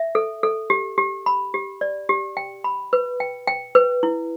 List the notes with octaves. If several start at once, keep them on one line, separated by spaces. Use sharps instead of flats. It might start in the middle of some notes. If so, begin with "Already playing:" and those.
Already playing: E5
A4
A4
G4
G4
B5
G4
D5
G4
G5
B5
B4
G5
G5
B4
E4